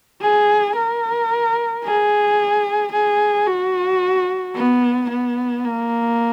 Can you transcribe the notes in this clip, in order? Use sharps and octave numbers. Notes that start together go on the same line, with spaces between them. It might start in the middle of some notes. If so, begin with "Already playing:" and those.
G#4
A#4
G#4
G#4
F#4
B3
B3
A#3